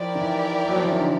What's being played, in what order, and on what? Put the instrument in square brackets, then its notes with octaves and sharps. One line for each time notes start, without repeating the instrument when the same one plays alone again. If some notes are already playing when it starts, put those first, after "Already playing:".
Already playing: [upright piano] F3 [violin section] E4 G4 A#4 D5 G5
[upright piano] D#3
E3
F#3
F3
E3
D#3
D3